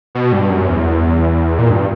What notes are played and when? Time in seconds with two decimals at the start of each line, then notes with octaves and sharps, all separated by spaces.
0.15 B2
0.32 G2
0.50 F#2
0.68 E2
1.59 A#2
1.70 G2